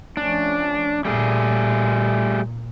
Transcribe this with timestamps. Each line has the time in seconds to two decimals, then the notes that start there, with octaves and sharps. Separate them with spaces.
0.17 F3 A3 C#4 D4
1.05 A#2 G3 A3 G#4